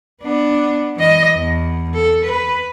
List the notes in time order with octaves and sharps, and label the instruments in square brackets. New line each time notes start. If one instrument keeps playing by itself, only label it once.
[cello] B3 D4
E3 D#5
E2
A4
B4